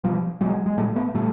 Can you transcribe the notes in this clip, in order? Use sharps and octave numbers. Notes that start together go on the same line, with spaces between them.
B2 F3 G3
B2 F#3 G#3
G#3
A#2 G3 A3
A3 B3
A#2 G3 A3